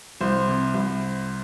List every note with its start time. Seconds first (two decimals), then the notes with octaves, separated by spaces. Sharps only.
0.20 C2 C5
0.48 C3
0.74 C2